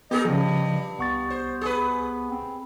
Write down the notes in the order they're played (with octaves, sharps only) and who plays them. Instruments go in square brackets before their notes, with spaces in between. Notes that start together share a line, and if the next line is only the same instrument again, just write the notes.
[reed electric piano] B3 [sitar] G4 G#4 A#4 [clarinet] D#5
[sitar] G2 [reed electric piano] C#3 F3
[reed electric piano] C2 C#6 A6 [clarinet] B3
[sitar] C5
G#4 B4
[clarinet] C4